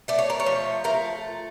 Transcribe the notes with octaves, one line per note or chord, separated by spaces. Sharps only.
A3 D5
C#5
A#4
C#5
F3
A3 A#4